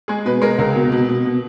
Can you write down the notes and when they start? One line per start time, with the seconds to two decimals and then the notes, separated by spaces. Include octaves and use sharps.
0.08 G#3 G#4
0.25 B2 B4
0.42 G#3 A#4
0.58 C#2 A#4
0.76 B2
0.92 B2
1.09 B2
1.25 B2